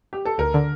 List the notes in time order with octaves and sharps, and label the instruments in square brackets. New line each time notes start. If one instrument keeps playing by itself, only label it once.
[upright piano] G4
A4
[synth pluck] D2 [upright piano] A#4
[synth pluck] D3